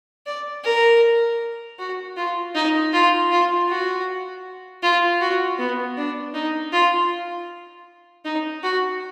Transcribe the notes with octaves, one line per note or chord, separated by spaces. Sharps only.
D5
A#4
F#4
F4
D#4
F4
F4
F#4
F4
F#4
B3
D4
D#4
F4
D#4
F#4